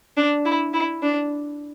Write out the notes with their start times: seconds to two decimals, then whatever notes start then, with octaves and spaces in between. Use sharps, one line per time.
0.17 D4
0.45 E4
0.73 E4
1.02 D4